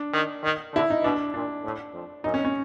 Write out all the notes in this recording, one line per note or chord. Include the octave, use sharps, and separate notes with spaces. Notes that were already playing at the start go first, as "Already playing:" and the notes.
Already playing: D4
D#3
D#3
D3 E4
D#4
B2 D4
A#2 D4
A2
F2
F#2 D#4
C#4
C#4